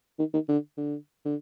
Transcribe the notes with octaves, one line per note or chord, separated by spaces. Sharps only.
D#3
D#3
D3
D3
D3